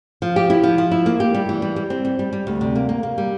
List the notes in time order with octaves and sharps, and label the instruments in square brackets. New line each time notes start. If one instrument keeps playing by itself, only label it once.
[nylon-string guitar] F3
G4
E4
F3
F3
E4
A#3
G4
G3
E3
G3
G3
C4
G3
G3
G3
D2
C3
A#3
A#3
A#3
G3